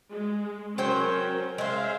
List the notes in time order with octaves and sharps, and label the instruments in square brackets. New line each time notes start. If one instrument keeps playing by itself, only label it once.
[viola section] G#3
[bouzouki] F#3 C5 G5 [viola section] C#4 A#4
[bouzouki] G#3 C5 [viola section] E5 F5